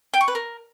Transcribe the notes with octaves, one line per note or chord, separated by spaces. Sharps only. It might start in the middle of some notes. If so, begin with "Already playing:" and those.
G5
C#6
B4
A#4